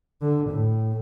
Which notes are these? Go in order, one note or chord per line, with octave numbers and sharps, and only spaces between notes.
D3
A2